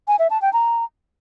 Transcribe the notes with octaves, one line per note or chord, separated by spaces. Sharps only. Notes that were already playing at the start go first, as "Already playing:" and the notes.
G#5
E5
A5
G5
A#5